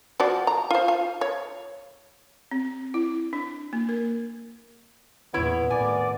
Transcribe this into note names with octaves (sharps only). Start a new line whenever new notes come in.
F3 F#4 D5
A#5
F4 C5
F4 F5
C#5
C4
E4
D4
A#3
A#4
E2 A#2 B3 E4 C#5
A2 C3 D#3 D5 G#5